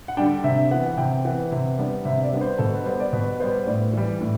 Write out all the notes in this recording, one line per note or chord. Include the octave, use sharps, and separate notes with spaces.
F#5
D3 G3 D4 G5
C3 E5
E3 B3 F#5
C3 G5
E3 B3 F#5
C3
G3 B3 D4
C3 E5
D5
G3 B3 D4
C5
B2 A4
B4
G3 B3 C5
D5
B2 B4
G3 B3 C5
A2 D5
E3 G3
A2